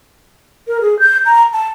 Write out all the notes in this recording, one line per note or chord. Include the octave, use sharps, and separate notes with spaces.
A#4
G#4
G6
A#5
A5